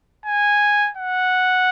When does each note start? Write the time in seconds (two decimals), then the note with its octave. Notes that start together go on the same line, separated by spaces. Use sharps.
0.26 G#5
0.97 F#5